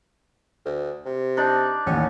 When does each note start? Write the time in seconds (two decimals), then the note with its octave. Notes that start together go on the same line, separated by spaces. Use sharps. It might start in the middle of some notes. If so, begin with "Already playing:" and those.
0.65 D2
1.06 C3
1.37 D4 D#4 D5
1.86 A1 D#2 C#4